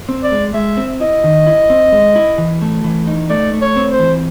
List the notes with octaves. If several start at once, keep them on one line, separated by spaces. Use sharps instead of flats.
C4
D5
G#3
G#3 E5
C4
E4 D#5
D#3
E4
C4
G#3
E4
E3
A3
E3
D#4
A3 D5
A3
C#5
C4
C5
E3